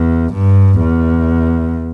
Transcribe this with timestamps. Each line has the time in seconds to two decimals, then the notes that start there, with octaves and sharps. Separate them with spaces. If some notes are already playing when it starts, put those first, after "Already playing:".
Already playing: E2
0.33 G2
0.80 E2